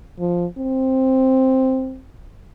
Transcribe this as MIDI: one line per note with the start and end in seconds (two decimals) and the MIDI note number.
0.19 0.46 53
0.58 2.01 60